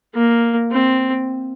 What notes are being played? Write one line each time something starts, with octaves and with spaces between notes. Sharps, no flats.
A#3
C4